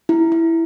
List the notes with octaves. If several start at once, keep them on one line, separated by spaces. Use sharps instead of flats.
E4
E4